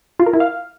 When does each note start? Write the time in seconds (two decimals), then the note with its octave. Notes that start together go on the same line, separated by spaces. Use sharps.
0.20 F4
0.26 A#4
0.33 E4
0.40 F5